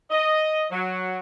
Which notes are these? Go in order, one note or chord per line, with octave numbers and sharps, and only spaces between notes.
D#5
F#3